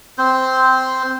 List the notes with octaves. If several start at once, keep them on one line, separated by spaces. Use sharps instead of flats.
C4 C5